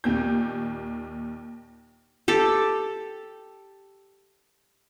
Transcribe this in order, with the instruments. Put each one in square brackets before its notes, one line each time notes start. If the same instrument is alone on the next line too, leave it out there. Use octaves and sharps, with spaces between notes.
[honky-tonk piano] D#2 A#2 G6
[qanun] G4 A4